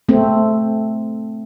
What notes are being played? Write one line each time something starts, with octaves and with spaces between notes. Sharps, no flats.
A3 C4